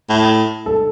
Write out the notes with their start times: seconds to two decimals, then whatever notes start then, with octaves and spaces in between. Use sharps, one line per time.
0.09 A2
0.66 A4